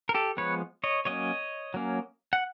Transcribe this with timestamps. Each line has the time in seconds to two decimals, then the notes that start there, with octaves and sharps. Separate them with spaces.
0.09 A#4
0.14 G4 A4
0.37 F3 G#3 B3 B4 C#5
0.84 C#5 D#5
1.05 F#3 A#3 C#4 C#5 D#5
1.74 F#3 A#3 C#4
2.33 F#5